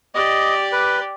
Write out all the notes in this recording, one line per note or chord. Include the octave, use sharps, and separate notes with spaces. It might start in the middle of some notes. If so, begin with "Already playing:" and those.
G4 D5 D#5
B4